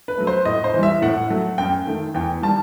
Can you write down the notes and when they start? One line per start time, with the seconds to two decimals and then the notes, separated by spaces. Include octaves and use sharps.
0.08 B4
0.18 F#3 A3
0.27 C5
0.45 A2 D#5
0.64 C5
0.73 E3
0.79 G3 E5
1.02 A2 F#5
1.30 F#3 A3
1.58 F#2 G5
1.87 D#3 A3
2.14 E2 G5
2.43 D#3 G3 A5